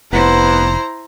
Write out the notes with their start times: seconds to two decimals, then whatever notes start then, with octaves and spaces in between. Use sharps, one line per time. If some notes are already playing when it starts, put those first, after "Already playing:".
0.13 F1 G2 B3 E4 C5 A#5